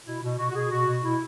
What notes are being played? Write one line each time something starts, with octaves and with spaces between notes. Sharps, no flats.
B2 E4
B2
B2 F#4
F#4
B2 G#4
B2 F#4
B2
B2 E4